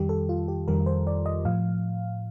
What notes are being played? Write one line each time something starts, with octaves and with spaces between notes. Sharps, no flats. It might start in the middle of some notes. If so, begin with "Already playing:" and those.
Already playing: F2 D#3 G3 G4
A4
F4
G4
F2 D#3 G3 A#4
C5
D5
D#5
A2 F3 F5